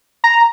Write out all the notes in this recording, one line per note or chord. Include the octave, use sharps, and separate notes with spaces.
A#5